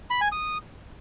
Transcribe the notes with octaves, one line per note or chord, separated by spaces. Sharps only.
B5
G#5
D#6